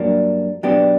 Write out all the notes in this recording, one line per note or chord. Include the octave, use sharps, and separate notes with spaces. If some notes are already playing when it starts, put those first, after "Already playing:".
Already playing: G2 F#3 A#3 D4
B2 F#3 B3 D4 G4